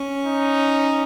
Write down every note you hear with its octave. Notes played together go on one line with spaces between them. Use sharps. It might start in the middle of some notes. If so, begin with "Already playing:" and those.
Already playing: C#4
D#4